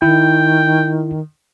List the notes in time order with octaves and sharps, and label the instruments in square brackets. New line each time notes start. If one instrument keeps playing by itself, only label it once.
[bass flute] D#3 [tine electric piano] E4 [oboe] G5